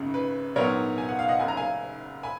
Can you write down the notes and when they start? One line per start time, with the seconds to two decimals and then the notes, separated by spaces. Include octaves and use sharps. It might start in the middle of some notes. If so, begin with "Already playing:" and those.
Already playing: G#1 F#2 C#3
0.14 B4
0.56 A#1 G#2 F#3 B3 D#4 A#4 C#5
0.98 G#5
1.09 F#5
1.19 F5
1.28 D#5 F#5
1.39 F#1 F#2 C#3 G#5
1.48 A#5
1.57 F5 G#5
2.23 G#5 B5